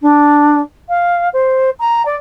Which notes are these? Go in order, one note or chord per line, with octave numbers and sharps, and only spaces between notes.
D4
F5
C5
A#5
D5